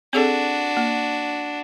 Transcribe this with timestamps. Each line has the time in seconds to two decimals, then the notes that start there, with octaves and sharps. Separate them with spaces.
0.13 C4 D4 F#4 G#4 A4
0.77 A#3